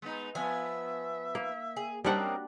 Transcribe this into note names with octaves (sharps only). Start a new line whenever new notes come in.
G#3 B3 D#4
F3 B3 E5 G#5
A#3
G#4
F#2 G3 A#3 C4 D4 A#4 D#5 F#5